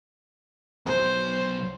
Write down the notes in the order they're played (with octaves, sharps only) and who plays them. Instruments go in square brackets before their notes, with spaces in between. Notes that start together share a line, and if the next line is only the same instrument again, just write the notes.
[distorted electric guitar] B1 E2 [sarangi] C5